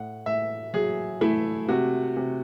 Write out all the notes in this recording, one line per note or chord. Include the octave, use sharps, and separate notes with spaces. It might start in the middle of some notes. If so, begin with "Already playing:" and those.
Already playing: A2 F#5
A2 E5
F#3 G#4
A3 E4
C3 F#4
C3